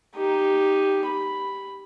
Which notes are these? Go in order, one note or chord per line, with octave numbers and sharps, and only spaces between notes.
D#4 G4
B5